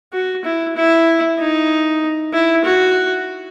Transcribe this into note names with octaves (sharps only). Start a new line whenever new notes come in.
F#4
E4
E4
D#4
E4
F#4